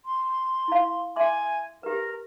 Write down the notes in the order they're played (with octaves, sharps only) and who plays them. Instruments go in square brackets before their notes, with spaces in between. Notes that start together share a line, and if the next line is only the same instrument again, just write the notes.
[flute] C6
[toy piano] E4 F5
[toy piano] E5 C6 D6 [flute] G#5
[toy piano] G4 B4 [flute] A#4